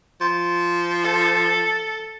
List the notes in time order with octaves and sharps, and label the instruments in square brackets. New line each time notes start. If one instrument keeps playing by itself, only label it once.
[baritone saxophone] F3
[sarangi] A4